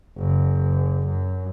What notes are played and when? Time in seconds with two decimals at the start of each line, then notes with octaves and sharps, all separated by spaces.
0.18 F#1
1.06 F#2